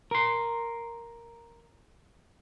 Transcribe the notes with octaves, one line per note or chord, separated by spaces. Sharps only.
A#4 C6